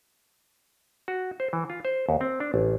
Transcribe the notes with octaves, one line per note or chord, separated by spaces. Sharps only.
F#4
C5
E3
F4
C5
D#2
C4
D4
A1